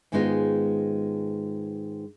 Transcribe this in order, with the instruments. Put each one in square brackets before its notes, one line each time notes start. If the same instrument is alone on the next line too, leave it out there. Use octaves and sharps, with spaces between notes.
[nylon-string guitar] G#2 D#3 G#3 B3 D#4 F4